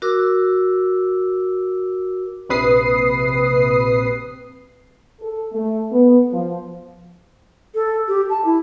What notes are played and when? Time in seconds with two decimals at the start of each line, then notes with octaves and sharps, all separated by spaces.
0.02 F#4 A#4 D6 E6
2.49 A#1 C3 B4 D#6 C7
5.22 A4
5.52 A3
5.91 B3
6.32 F3
7.75 A4
8.08 G4
8.30 A5
8.45 E4